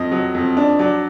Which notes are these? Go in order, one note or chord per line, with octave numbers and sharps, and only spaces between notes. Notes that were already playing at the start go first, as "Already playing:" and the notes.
Already playing: F2 D#5
F#3
F2
D4
F#3 D5